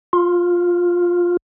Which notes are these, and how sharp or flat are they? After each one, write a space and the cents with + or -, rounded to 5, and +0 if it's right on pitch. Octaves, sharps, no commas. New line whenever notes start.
F4 +10